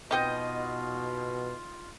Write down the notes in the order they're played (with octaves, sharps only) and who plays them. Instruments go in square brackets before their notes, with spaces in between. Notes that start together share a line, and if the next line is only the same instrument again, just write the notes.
[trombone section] B2 [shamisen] C4 G5 [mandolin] D#4 D#5 G6 [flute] F4